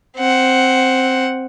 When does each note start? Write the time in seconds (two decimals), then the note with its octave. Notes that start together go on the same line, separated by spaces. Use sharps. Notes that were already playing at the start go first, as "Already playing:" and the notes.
0.17 C4 F#5